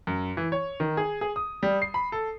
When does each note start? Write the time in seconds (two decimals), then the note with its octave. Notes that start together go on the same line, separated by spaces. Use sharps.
0.07 F#2
0.37 E3
0.52 C#5
0.80 D#3
0.97 G#4
1.21 G#4
1.36 D#6
1.63 G3
1.82 C7
1.94 B5
2.12 A4